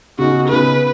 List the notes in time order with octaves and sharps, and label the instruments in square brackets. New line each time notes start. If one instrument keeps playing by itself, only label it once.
[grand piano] C#3 B3 D#4 G#4 [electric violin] F#4
[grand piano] C#3 B3 D#4 G#4 [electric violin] B4